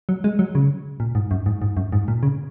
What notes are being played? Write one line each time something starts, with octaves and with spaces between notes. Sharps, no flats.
F#3
G#3
F#3
C#3
A#2
G#2
F#2
G#2
G#2
F#2
G#2
A#2
C#3